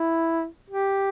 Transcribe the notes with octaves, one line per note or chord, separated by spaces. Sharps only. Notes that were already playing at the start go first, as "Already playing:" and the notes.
Already playing: E4
G4